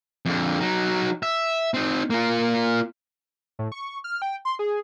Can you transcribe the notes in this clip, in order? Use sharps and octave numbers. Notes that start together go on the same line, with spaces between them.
F2 D3
F#3 D#4
E5
C4 D#4
A#3 F4
A2
C#6
F6
G5
C6
G#4